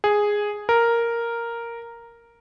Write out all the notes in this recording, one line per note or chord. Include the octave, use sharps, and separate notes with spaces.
G#4
A#4